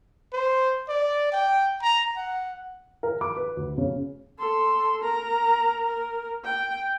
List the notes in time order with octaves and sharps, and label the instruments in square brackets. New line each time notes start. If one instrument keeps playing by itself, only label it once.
[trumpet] C5
D5
G5
A#5
F#5
[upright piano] A#4
D6
B4
D2
C#3
[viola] A4 C6
A#4 A#5
A#4
G5